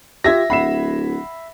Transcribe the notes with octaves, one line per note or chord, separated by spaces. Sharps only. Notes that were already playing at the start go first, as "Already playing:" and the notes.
F4 G4 E5 G#6 A#6
D1 E5 F#5 B5 C7 E7